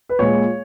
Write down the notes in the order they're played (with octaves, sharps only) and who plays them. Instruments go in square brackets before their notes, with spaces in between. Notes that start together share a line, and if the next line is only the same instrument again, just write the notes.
[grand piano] B4
A#2 G#3 C#5